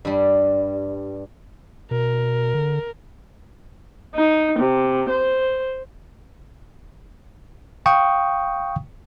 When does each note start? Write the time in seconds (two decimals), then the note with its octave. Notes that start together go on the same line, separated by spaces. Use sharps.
0.05 G2 G3
1.91 B2 A#4
2.54 D3
4.15 D#4
4.59 C3
5.09 C5
7.86 F5 G5 C#6 D#6